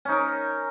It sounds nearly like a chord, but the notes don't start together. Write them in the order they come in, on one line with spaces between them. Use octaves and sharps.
C#4 D#4 A#4